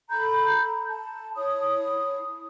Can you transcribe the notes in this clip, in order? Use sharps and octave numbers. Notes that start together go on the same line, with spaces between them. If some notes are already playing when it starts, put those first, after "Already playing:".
A4 A#5 B5 G6
A5
E4 C#5 D#6